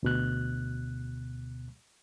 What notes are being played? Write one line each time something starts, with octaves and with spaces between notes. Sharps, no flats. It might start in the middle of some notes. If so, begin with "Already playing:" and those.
D2 B2 F#6